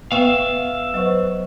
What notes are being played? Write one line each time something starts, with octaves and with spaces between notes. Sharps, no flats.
B3 E5 F5 G5 C#6
F#3 B4 C5 D#5 C#6